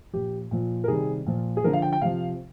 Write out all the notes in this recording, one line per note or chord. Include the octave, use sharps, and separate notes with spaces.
A#2 F3 G4
A#2 F3
A#4
C3 D#3 G3 G#4
A#2 F3
G#4
D3 F3 A#4
F5
G5
G5
C3 F3 F5